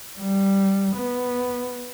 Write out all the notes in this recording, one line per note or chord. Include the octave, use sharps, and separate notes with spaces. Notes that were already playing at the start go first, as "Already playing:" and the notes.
G3
B3